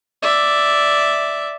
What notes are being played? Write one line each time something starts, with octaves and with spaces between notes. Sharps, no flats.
D5 E5